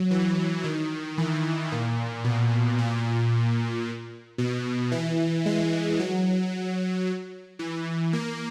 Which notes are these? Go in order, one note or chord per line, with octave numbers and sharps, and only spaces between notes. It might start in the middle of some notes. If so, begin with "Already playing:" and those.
Already playing: F#3
E3
D#3
E3
A#2
B2
A#2
B2
E3
G#3
F#3
E3
A#3